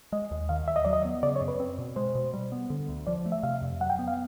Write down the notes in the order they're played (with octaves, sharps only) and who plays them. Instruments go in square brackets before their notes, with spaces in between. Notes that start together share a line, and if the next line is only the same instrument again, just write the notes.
[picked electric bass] G#3 [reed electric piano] D#5
[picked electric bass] D#2
[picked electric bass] D#3 [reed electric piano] F5
[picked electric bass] D#2 [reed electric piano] E5
[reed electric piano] D#5
[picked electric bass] F#3 [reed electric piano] D5
[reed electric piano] D#5
[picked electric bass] B3
[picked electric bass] C#3 [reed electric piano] D5
[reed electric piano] C#5
[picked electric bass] F#2
[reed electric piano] B4
[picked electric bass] C4
B2
[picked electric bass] G#3 [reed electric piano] C5
[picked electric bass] B2
G3
B3
D3
D2
[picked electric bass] F3 [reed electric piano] D5
[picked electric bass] A3
[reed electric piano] E5
[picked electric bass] C3 [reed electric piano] F5
[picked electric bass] F2
[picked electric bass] F#3 [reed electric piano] F#5
[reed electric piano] G5
[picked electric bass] B3
[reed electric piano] F5